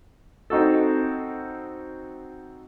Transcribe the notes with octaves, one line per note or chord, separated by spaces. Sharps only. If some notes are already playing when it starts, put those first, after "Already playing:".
C4 D#4 F#4 A4